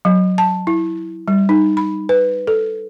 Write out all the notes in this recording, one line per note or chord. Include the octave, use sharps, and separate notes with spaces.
F#3
A5
E4
G3
D#4
B5
B4
A4